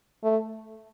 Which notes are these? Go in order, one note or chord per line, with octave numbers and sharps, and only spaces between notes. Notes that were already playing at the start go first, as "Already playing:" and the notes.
A3